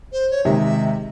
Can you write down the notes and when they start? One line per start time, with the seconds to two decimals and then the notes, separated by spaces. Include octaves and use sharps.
0.12 C5
0.31 C#5
0.45 C3 D#3 G#3 E5